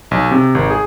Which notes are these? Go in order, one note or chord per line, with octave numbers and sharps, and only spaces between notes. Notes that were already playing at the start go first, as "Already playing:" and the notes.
B1
C3
G#1
G#4